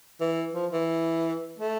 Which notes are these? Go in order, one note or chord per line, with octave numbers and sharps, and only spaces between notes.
E3
F3
E3
A3